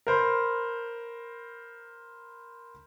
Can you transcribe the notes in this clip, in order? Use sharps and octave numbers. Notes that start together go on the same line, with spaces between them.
A#4 C5 B5